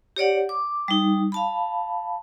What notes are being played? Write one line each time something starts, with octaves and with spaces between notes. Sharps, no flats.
G4 C#5 D5 F#5
D6
G3 D#4
F5 A5 B5